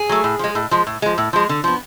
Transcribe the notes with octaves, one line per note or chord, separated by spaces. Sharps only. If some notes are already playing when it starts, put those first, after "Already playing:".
Already playing: G#4
F#3 A3
A2
F3 G#3
A2
F3 G#3
A2
F3 G#3
A2
F3 G#3
D3
F3 B3